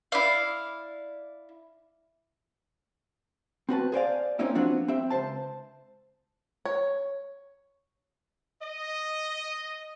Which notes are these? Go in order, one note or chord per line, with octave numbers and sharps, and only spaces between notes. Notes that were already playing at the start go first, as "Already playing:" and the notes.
E4 D5 F5
C4 F#4 B4 A5
G#4 C5 D5 F5
A#3 C4 C#4 D#4 E4 G4
F3 B3 C4 D4 F#4
C4 G4 E5
C#2 C5 A5
C#5
D#5